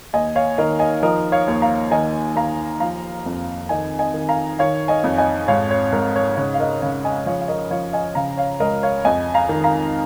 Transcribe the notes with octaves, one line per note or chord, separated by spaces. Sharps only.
D#2 D#5 G#5
C#5 F5
D#3 A#4 D#5
D#5 G#5
F3 A#4 D#5
C#5 F5
D#2
F5 A#5
D#3 D#5 G#5
D#2 F5 A#5
F3 F5 A#5
F2
D#3 D#5 G#5
D#5 G#5
D#3
F5 A#5
D#3 C#5 F5
D#5 G#5
F2
D#5 G#5
G#2 C#5 F5
C#5
G#2 A#4
C#5
C#3 C#5
F5
A#4 D#5
C#3 C#5 F5
D#5 G#5
F3 C#5 F5
F5
A#4 D#5
F3 C#5 F5
D#5 G#5
C#3 F5 A#5
C#5 F5
C#2 A#4 D#5
C#5 F5
F2 D#5 G#5
F5 A#5
D#3
F5 A#5